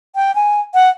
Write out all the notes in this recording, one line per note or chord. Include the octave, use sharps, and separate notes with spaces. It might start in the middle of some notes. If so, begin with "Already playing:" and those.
G5
G#5
F#5